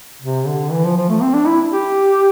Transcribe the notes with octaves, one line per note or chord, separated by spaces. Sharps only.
C3
D3
E3
F3
F3
A3
C4
D4
E4
G4